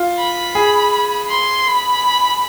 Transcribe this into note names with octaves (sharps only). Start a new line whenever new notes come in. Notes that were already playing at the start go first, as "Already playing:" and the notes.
Already playing: F4
B5
G#4
C6
B5